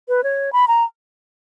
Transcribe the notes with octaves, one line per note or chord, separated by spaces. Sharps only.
B4
C#5
B5
A#5